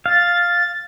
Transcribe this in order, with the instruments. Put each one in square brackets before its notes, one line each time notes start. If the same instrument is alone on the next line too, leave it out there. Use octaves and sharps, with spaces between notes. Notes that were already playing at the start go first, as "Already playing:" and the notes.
[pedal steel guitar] F5 [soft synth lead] A6